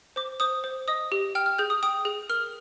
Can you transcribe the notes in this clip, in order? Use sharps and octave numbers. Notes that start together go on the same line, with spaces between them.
C5 D6
C5 D#6
C5
D#5 D#6
G4
G5 F6
F6
G#4 G6
D#6
G5 D#6
G#4
A#4 F6